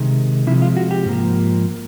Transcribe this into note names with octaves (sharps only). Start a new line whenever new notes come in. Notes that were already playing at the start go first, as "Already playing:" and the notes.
Already playing: C3 D#3 G#3
C3 F3 G#3 E4
F4
F#4
G4
G#2 F3 A#3